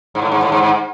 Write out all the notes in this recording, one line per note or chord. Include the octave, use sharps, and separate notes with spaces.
G#2
A2
G#2
A2
G#2
G#2